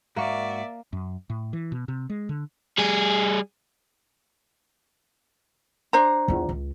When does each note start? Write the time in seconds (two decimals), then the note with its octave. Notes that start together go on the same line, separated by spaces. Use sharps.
0.16 G#2 A#3 F#4 D5 E5
0.93 F#2
1.30 A2
1.53 E3
1.72 B2
1.88 C3
2.10 G#3
2.29 D3
2.78 G3 G#4
5.93 D4 C5 A#5
6.28 E2 F4
6.49 C#2